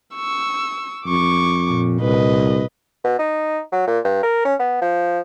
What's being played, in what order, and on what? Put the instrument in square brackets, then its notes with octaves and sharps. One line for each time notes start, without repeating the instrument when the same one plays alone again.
[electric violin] C#6 E6
[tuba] F2 [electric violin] C#6 D6
[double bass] A#2
[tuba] C2 [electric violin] B4 D#5
[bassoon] B2
D#4
F#3
A#2
G2
A#4
C#4
B3
F3